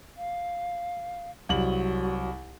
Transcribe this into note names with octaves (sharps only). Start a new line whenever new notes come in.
F5
C2 F#3 F#7